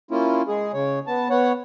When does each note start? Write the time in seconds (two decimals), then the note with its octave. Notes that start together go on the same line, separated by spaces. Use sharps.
0.11 A#3 C#4 E4 F4
0.48 G#3 G#4
0.73 C#3 C#5
1.07 B3 A5
1.30 B3 C#5 F#5